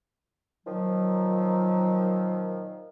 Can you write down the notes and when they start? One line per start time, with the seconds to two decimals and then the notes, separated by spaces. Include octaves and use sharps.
0.66 A#2 D#3 F3 F#3